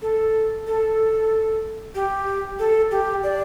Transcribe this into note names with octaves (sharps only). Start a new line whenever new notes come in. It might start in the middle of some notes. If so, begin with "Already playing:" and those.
A4
A4
G4
A4
G4
D5